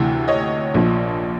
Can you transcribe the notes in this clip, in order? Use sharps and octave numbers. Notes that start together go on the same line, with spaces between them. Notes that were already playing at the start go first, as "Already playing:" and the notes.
Already playing: D2 C3 E3
C#5 D#5
A#1 A#2 F3